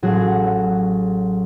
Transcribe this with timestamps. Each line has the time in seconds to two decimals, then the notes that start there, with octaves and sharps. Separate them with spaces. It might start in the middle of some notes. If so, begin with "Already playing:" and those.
0.03 A1 F#3 F#4 G#4